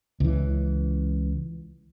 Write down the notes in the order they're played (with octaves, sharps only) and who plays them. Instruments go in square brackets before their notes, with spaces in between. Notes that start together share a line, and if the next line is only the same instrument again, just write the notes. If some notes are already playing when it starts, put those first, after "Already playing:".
[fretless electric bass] C#2 E3